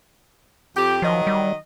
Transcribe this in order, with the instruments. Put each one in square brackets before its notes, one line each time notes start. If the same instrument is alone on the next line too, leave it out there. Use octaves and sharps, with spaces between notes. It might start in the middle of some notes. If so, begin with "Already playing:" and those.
[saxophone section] F2 G4
[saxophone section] D#3 F#3 D#5 [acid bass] F3
[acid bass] G3